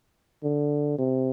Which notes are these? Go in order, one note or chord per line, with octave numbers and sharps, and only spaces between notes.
D3
C3